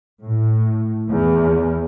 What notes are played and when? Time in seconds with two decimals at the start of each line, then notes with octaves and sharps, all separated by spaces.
0.23 A2
1.08 E2